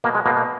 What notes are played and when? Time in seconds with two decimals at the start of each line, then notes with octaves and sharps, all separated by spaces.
0.04 B2 A#3
0.15 G#3
0.26 B2 A#3
0.37 A#3